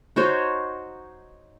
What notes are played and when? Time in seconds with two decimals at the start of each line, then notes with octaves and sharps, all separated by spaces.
0.16 D#4 F#4 C5 C#5